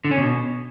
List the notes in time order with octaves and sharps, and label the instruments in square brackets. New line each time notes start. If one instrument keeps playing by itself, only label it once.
[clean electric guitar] D3
C#4
B2